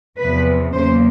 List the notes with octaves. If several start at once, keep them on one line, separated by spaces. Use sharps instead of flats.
E2 C3 F3 B4
E2 C#3 F#3 A#3 C5